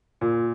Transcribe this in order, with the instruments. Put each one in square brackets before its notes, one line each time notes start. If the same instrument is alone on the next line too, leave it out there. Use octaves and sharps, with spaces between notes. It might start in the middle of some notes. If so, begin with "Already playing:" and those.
[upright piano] A#2